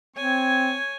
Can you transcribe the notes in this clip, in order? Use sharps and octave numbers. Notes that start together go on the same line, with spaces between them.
C4 C#5 G#5